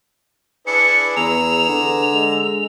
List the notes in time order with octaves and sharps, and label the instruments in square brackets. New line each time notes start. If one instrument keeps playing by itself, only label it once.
[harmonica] D4 E4 G#4 [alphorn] B4 [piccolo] C#7
[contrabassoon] E2 [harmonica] G#4 A#5 E6 [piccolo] F7
[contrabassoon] D3 [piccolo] F7
[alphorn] G#3